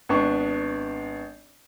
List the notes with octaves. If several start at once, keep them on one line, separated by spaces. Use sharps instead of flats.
G#1 B3 D4 C#6